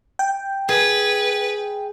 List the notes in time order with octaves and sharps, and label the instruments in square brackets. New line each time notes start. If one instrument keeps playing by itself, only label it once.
[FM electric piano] G5
[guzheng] G#4 [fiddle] B4